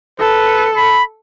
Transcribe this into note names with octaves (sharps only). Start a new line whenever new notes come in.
A4 B4
B5